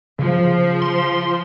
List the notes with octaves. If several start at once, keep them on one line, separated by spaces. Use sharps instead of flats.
C#3 F3
C6